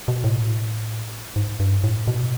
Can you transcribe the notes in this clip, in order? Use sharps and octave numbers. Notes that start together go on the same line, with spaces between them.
B2
A2
G#2
G2
A2
B2